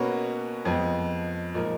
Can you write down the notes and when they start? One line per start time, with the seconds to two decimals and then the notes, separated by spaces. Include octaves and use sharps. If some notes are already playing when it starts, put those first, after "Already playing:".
Already playing: B2 A#3 C#4 F#4 B4
0.65 F2 F3 G#3 B3
1.54 A#2 F3 G#3 D#4 A#4